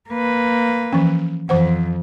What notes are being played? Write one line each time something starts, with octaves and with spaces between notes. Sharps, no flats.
A#3 B4
E3 F3 C#4
F2 E3 C5 F#5